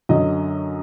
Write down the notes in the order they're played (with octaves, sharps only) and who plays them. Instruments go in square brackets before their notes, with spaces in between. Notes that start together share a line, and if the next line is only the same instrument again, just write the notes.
[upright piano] F#2 D3 F#3 D#5